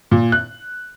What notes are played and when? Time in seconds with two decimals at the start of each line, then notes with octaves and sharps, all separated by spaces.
0.11 A#2
0.32 F#6